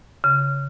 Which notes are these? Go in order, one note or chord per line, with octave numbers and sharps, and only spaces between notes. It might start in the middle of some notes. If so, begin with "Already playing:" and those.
C#3